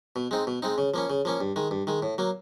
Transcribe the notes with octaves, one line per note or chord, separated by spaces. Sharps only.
B2
G#3 C4 D#4
B2
G#3 C4 D#4
C#3
F3 A#3 C#4
C#3
F3 A#3 C#4
G2
D#3 G#3
G2
D#3 G#3
A2
F#3 A#3